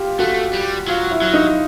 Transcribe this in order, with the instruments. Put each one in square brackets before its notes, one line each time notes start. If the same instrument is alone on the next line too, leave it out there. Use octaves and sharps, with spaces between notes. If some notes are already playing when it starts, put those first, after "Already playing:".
Already playing: [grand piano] F4 G4
[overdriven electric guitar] A3 [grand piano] F#4
[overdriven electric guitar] G3
[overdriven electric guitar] F#3 [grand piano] F4
[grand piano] E4
[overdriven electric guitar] F#3
[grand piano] D#4